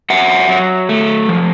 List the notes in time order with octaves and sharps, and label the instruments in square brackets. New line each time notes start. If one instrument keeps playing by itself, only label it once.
[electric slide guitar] F#3 E5 F#5
F#3
A3
F3